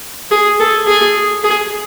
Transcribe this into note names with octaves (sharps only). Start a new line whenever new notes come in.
G#4
A4
G#4
G#4